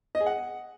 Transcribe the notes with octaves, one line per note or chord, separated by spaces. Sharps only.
D#5
G#4
F#5